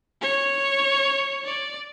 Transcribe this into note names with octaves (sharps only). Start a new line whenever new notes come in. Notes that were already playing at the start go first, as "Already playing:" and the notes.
C#5
D5